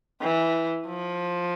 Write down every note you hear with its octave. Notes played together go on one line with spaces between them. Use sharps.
E3
F3